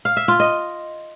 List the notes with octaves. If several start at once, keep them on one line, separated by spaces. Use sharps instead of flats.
F5
E5
F4
D#5